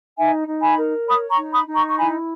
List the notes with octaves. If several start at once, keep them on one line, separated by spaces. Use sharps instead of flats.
D#4 E5 G#5
D#4
G#5 B5
A#4
C#5 B5 D#6
A#5 C#6
D#4
B5 D#6
D#4
A#5 C#6
C#6
E4 G#5 B5